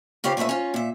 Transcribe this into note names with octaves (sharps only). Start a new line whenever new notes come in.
C#3 C#4 F4 G4 B4 F5
A#2 A3 C#4 B4 E5
C#4 F4
A#2 E5